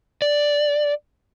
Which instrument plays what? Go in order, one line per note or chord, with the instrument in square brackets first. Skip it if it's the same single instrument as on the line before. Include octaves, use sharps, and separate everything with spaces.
[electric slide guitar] D5